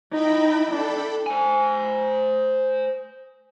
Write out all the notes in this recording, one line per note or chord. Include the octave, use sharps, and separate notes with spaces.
D#4 E4 G5 B5
D4 A4 G5 B5
C5 G#5